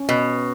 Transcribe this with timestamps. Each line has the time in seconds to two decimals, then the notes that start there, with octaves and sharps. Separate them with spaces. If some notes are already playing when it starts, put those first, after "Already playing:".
Already playing: C#4
0.09 B2